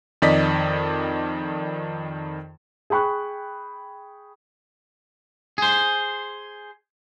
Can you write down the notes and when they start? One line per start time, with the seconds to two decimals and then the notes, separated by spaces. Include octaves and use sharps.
0.22 F2 D#3 D5 D#5 B6
2.90 G#4 G5 B5 C#6 F#6
5.58 G#4 C5